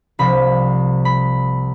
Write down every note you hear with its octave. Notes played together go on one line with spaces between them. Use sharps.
C2 C3 F3 B5
B5